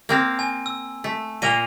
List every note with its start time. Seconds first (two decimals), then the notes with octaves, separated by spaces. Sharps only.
0.09 A#3 C4 F5
0.39 G#5
0.66 E6
1.04 A3
1.42 A#2 A#3 D#7 F7 G7